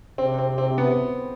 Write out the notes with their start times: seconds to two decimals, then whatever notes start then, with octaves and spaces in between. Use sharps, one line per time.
0.18 C3 C4
0.39 C4
0.58 C4
0.78 B3